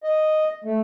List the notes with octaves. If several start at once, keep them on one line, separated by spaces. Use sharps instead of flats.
D#5
A3